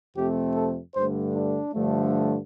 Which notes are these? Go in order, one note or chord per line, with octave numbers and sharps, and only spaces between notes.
F2 C3 A3 C4 G4
A4
G2 D3 A3 C5
D4
G2 D3 F3 A3